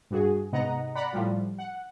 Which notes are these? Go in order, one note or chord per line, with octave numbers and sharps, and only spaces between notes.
G2 F#4 G#4
G#2 C3 B3 D#5 F#5 A#5
D5 F#5 A#5 B5
A2 F3 G3 F4
F#5